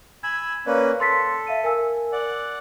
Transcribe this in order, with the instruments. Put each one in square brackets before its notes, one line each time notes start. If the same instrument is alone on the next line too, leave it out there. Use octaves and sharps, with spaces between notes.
[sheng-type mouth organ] G#5 B5 E6 [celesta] G#6
[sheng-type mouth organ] A#3 C#4 B4 [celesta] D5
[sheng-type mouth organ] A4 [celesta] C6 A6 B6
[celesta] E5 F5 D#7
A#4 G#5 E6
[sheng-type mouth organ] D5 F#5